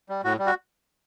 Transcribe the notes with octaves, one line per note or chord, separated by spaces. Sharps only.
G3
A2 F#4
G3
F#4